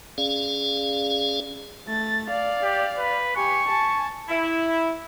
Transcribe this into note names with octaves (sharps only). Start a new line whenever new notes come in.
C#4 G#4 D5 F5
A3 A6
D5 F5
G4
B4
G4 G#5 C#6
G#5 A5
E4